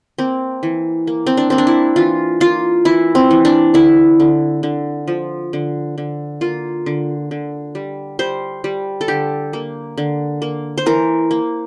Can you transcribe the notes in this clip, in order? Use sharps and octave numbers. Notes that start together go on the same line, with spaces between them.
A#3 C4
E3
A#3
C4
D4
A#3 C4
D4
E4
E3 F4
A#3 F4
E3 E4
C4
E3
D4
D3 E4
D3
D3
F3
D3
D3
A#3 F4
D3
D3
G3
G3 C5
G3
A4
D3 G4
A#3
D3
A#3
C5
E3 A#4
A#3